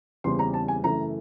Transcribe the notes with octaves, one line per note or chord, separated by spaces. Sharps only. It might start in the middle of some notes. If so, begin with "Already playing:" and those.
E2 C#3 E3 G3 C4 C6
A#5
A5
G#5
F#2 C#3 E3 A3 A#5